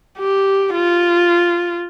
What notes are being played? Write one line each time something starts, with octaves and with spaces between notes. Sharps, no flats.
G4
F4